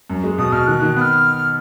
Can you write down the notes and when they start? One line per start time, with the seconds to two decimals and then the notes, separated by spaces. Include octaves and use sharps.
0.10 F#2
0.24 G#3
0.38 B2 D#6
0.52 B2 F6
0.67 D#3 F#6
0.82 D#3
0.96 B3 F#6
1.01 F6